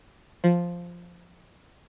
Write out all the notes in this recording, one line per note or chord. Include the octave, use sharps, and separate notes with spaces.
F3